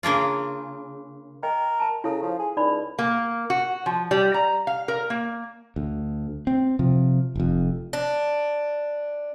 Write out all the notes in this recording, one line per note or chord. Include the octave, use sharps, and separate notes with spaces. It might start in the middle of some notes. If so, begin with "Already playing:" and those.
C#3 A#3 D4 F4
A#4 D#5 G5
A5 A#5
C#3 E4 A4
F3
G#4
C#2 D#4 D5 B5
A#3
F#4
F3
G3
A#5
F5
A#4
A#3
D2
C4
C3 F3
F1 F2
D4